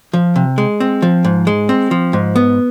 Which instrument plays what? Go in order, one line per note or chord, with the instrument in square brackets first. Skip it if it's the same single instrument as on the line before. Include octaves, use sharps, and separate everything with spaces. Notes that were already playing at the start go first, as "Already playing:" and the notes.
[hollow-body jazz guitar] F3
C3
G#3
C4
F3
G#2
G#3
C4
F3
G#2
B3